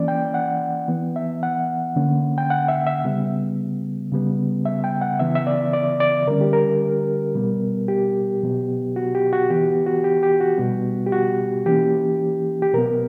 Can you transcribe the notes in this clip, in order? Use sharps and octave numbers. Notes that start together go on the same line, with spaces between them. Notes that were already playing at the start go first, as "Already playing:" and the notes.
Already playing: E3 A#3 C#4 D5
G5
F#5
E3 B3
E5
F#5
D3 A#3 C#4
G5
F#5
E5
E5
C#3 G3 B3
C#3 G3 B3
E5
G5
F#5
C#3 E3 B3 E5
E5
D5
D5
D5
D3 G3 C#4 A#4
G4
A#4
B2 G3 B3
G4
B2 F#3 B3
F#4
G4
F#4
E3 B3 G4
F#4
G4
G4
F#4
B2 G3 B3
G4
F#4
E3 A#3 C#4 G4
G4
B2 F#3 B3 A#4